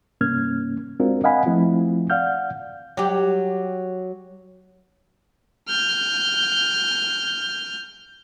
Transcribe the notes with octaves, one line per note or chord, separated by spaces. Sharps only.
G2 C3 A#3 C#4 F6 G#6
G#3 C4 D4 F4 F#4 A#4
D#5 F5 F#5 G#5 B5
F3 A3 C4 E4 F4
D5 F5 F#5 F6 G6
F#3 G4
F6 G6